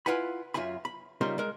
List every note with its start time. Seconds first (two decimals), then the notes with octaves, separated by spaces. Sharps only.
0.06 E4 F4 B4 F#5 G#5 B5
0.54 F#2 F4 E5 G#5 B5
0.85 B5
1.21 C#3 G3 D#4 F4 A#4 C6
1.38 G#3 A#4